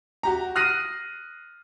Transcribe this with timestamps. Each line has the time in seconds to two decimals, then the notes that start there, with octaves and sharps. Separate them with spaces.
0.23 F#4 G4 A#5
0.55 D#6 F6 F#6 A#6 C7 D#7